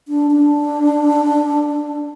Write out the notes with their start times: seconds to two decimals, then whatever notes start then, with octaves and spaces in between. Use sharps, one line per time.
0.08 D4
0.31 D4